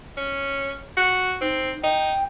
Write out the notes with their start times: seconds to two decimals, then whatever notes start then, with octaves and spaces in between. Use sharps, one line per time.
0.17 C#4
0.97 F#4
1.41 C4 D#4
1.83 D#4 G5